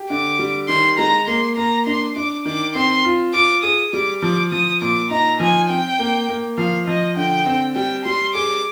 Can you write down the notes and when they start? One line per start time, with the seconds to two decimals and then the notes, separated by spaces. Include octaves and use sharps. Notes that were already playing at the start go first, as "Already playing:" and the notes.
Already playing: G4
0.10 D3 D6
0.39 G3
0.68 D#3 C6
0.98 G#3 A#5
1.27 A#3 C6
1.57 A#3 A#5
1.86 D4 C6
2.16 D4 D6
2.45 D#3 D6
2.75 C4 C6
3.05 F4
3.34 F4 D6
3.63 G#4 D#6
3.93 G3 D6
4.22 F3 D6
4.52 F3 D#6
4.81 A#2 D6
5.11 D#4 A#5
5.40 F3 G#5
5.69 C4 G5
5.99 A#3
6.29 A#3
6.58 F3 F5
6.87 F3 D#5
7.17 D3 G5
7.46 C4
7.75 G3 G5
8.05 G3 C6
8.35 G#4 D6